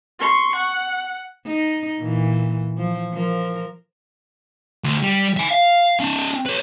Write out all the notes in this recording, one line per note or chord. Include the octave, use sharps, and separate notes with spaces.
C6 C#6
F#5
D#4
A#2 E3
F3
F3 A#4
D2
G3
E5 G#5
F5
C#4 D#4
B4 C#5